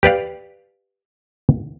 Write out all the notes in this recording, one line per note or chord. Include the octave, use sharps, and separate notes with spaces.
G4 B4 D5 F5